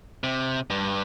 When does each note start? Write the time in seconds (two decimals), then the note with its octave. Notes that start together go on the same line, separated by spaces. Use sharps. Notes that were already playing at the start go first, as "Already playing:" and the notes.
0.24 C3
0.70 G2